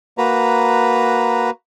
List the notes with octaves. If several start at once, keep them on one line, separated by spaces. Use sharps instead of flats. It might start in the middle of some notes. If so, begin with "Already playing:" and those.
A#3 F#4 B4 A#5